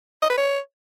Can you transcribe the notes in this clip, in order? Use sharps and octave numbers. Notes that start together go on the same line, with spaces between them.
D#5
B4
C#5